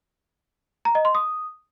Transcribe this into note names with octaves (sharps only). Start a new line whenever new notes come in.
A#5
D#5
C6
D#6